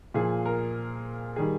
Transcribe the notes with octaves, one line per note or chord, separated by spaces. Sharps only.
A#2 F3 G#4
A#4
D#3 G3 G#4